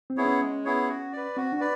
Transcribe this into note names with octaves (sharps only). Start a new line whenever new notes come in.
C4
B3 E4 G#4 C#5
C#4
G#3
B3 E4 G#4 C#5
F#4
B4 D5
C4 F#4
D4
B4 D5